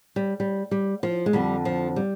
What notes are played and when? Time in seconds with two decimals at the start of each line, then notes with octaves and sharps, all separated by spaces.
0.16 G3
0.40 G3
0.71 G3
1.03 F3
1.26 G#3
1.33 F2 D3 G3
1.65 F3
1.96 G3